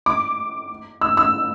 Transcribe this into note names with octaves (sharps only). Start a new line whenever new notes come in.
D6
E6
E6